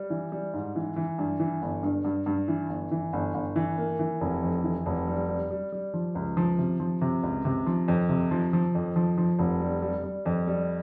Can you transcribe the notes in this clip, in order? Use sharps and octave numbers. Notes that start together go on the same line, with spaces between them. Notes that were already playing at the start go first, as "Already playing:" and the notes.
Already playing: G3
E3
G3
G#2
E3
E3
G2
E3
G1
G2
G2
G2
E3
G1
E3
G1
G1
E3
A#3
E3
F1
F2
E3
F1
G3
G3
G3
G3
F3
C#2
F3
C3
F3
C3
C#2
C3
F3
F2
C3
F3
F3
F2
F3
F3
F1
G3
G3
G3
F2
G3